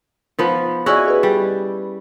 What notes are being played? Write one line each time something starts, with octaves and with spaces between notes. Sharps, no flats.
F3 B3 D#4
C#4 E4 F#4 G#4 D5 D#5
G#4 B4
G3